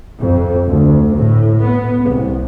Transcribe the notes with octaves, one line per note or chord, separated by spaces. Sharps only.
F2
D2
A2
B3
C2